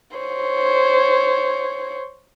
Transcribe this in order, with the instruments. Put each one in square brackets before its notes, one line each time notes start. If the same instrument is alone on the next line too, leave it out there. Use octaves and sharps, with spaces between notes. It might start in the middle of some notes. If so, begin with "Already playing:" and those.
[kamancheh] C5 C#5